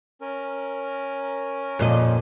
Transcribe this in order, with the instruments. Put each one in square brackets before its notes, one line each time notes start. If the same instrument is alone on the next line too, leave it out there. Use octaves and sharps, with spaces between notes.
[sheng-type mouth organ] C#4 A#4
[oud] F2 A#2 D#5 [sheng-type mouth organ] C#4